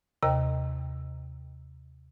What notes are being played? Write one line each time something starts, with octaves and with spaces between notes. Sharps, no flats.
D#2 C3 A#4 D#5 G5 A#5